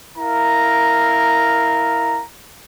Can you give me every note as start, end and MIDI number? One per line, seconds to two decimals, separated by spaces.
0.18 2.23 64
0.18 2.23 70
0.18 2.23 77
0.18 2.23 82